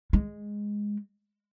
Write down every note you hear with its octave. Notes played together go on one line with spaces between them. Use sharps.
G#3